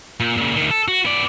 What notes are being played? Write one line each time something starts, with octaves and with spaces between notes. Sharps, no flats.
A#2
A#2 C#3
D2 D#3
A4
F#4
B3 D5